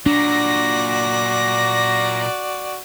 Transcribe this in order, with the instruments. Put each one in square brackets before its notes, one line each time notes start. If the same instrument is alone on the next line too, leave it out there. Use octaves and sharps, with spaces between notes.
[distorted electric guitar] A#2 F#3 [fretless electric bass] D4 [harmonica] F#4 D5 [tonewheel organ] A#6